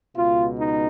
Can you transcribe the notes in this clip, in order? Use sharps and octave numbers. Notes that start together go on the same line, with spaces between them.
C#2 B2 F4
D#4